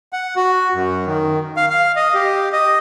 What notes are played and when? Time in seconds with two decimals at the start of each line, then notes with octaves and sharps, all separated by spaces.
0.13 F#5
0.36 F#4
0.74 F#2
1.07 D#3
1.56 F5
1.69 F5
1.96 D#5
2.14 G4
2.53 D#5